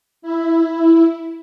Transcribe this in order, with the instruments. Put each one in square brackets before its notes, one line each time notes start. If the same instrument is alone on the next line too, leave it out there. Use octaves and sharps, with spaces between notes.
[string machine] E4